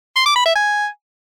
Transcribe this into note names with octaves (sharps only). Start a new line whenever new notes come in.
C6
D6
B5
E5
G#5